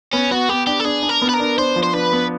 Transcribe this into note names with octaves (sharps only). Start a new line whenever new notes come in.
B3 C#4
B3 F#4
B3 G4
D4 G4
A4
D4 G#4
D4
A#4
B3
B4
A#4
D4
D4 C5
F3
C5
D4 B4
B3